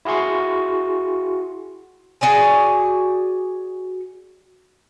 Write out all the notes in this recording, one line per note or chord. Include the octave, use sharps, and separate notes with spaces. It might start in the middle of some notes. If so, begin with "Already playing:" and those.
E4 F#4 G#4 C6 C#6
F#4 G#4 D5 G#5